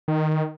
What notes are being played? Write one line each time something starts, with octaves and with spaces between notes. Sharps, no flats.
D#3